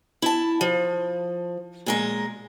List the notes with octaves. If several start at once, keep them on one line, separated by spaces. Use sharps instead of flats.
E4 A5
F3
A#2 G#3 A#4